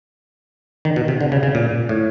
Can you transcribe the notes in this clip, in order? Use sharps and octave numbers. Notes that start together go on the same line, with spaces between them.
D#3
B2
C3
D3
C#3
C#3
A#2
A2